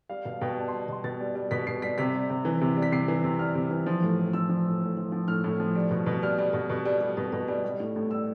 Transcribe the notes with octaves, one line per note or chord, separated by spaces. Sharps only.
G3 F5
B2 F5
B2 G5
G3 A5
G3 C6
B2 C6
B2 A6
G3
G3
B2 B6
B2 C7
G3 B6
C3 B6
G3
C3
E3
C3
G3
B6
C3 C7
E3
C3
G3 F6
C3
E3
F3
A2
A2
F3 E6
F3
A2
A2
F3
F3
A2 F6
A2
F3
G3
B2
B2
G3 F6
G3
B2
B2
G3
G3
B2
B2
G3
G3
A2
A2
G3 E6